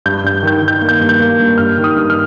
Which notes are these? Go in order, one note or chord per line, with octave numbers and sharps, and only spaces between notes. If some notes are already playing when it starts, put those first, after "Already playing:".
G2 G6
G2 G6
D#3 G6
D#3
G6
A#3
G6
G2
G6
A#3
G2
G2 F6
D#3
D#6
G2
F6